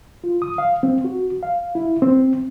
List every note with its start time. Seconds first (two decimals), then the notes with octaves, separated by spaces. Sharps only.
0.24 F4
0.42 D#6
0.58 F5
0.83 C4
1.05 F#4
1.43 F5
1.75 E4
2.02 C4